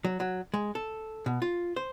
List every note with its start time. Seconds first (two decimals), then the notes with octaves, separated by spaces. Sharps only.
0.05 F#3
0.20 F#3
0.54 G#3
0.75 A4
1.26 B2
1.42 F4
1.76 C5